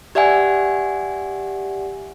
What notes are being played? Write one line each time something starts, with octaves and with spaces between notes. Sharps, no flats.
G4 D5 E5 F#5 G#5